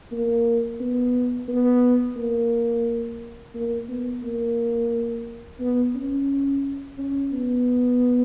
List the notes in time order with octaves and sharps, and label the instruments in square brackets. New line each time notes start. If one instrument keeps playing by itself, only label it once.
[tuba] A#3
B3
B3
A#3
A#3
B3
A#3
B3
C#4
C#4
B3